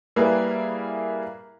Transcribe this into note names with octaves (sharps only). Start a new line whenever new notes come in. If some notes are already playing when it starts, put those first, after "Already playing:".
G3 A#3 E4 G#4 A#4 B4